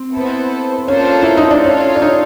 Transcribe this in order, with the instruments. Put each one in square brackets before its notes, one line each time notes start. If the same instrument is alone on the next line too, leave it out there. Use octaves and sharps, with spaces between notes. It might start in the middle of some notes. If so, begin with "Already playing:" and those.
Already playing: [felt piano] C4
[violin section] B3 E4 A4 C5
[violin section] A#3 D4 F4 A4 C5 [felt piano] C#4
[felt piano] E4
D#4
D4
[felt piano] C#4 [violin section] F4 A4 C#5 F5
[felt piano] D4
D#4